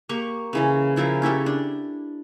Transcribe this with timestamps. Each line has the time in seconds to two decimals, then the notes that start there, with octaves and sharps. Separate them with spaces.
0.09 A#3 G4 A#5 C#6
0.53 C#3 E3 C#4
0.96 C#3 F3 E4 A#4
1.22 C#4 E4 G4 A4
1.46 D4